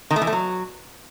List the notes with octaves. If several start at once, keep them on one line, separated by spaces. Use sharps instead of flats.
D#3
A3
E3
A3
F#3